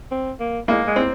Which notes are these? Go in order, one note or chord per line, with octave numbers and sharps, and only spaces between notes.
C4
A#3
G#3 A#3
G#3
C4